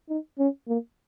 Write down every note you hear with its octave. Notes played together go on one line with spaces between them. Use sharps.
D#4
C#4
A#3